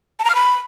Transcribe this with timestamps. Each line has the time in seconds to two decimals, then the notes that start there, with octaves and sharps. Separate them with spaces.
0.19 A5
0.25 A#5
0.30 F6
0.35 B5